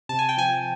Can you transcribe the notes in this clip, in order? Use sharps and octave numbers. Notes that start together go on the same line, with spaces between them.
C3 A5
G#5
G5
F3 G#5